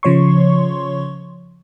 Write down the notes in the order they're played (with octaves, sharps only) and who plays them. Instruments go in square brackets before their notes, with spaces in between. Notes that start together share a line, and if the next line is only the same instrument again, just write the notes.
[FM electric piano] C#3 F3 C#5 C6 C#6